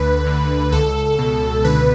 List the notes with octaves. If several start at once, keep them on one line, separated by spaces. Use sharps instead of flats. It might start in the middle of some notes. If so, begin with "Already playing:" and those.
Already playing: D2 D3 B4
D3
C#2 A4
B2
D3 B4